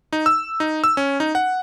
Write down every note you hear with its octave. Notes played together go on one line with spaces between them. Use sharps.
D#4
E6
D#4
E6
C#4
D#4
F#5